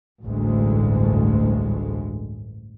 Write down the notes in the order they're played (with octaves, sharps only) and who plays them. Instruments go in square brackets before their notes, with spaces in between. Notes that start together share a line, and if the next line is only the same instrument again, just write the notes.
[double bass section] A1 D2 G2 G#3